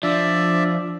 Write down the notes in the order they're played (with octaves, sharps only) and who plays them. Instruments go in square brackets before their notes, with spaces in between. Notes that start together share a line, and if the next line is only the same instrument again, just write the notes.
[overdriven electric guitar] F3 [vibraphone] D4 [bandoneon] D5 E5